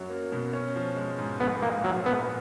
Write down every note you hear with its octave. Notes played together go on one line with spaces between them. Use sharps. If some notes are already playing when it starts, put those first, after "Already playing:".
Already playing: F#2 F#3 C#4
A#3
B2
C#4
F3
G#3
G#2
A#1 B3
A#2 A#3
F3 F#3
A#1 B3